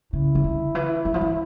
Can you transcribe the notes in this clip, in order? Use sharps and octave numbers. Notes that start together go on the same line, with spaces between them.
C#3 E4
C#3
D3
E3
E3
F3
E3